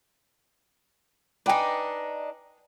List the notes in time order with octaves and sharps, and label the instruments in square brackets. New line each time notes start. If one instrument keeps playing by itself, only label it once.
[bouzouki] D4 D#4 [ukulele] B4 G5 G#5